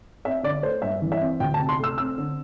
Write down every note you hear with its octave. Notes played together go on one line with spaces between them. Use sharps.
C4 E5
D3 D5
A3 C5
G2 E5
E3
E5
C4
D2 G5
A5
C3
C6
A3 E6
C4 E6
D3